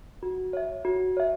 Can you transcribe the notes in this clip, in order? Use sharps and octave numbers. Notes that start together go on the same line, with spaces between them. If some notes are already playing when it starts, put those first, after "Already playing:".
F#4
C#5 E5
F#4
C#5 E5